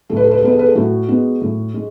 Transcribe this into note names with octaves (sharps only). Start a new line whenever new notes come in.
A2 A4
B4
A4
B4
A4
G#3 B3 B4
A4
B4
A4
A2 F#4
G#3 B3
A2
G#3